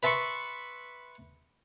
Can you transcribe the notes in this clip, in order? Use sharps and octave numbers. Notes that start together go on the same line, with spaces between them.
B4 E5 A5 C6 C#6